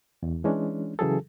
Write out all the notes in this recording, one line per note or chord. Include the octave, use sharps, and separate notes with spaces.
E2
E3 G#3 C#4 D4
C#3 E3 F#3 G#4 A4